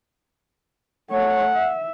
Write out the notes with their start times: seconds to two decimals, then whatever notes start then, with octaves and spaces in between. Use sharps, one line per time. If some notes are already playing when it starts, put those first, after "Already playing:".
1.11 A3 C#5 F#5
1.55 E5